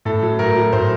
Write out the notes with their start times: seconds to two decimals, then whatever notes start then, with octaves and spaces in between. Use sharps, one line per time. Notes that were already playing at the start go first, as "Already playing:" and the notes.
0.05 A2 A4
0.22 F#3
0.39 A2 A#4
0.56 F#3
0.73 A2 C5